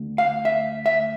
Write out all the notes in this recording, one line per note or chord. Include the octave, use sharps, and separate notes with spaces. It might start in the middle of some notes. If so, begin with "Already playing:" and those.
Already playing: D2
F5
E5
E5